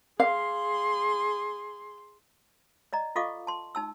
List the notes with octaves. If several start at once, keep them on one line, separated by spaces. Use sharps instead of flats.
G#4 F5 C6
D5 D#5 A#5
F4 A4 D#5 F5 C#6 D6
A5 C6
D#4 A5 E6